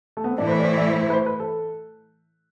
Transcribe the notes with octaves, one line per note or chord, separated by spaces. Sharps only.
A3
B3
C4
A2 E3 A3 D4 E4
C5
B4
D5
C5
D5
C5
C5
B4
C5
B4
A4